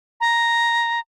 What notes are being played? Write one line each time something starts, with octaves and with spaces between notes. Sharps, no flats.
A#5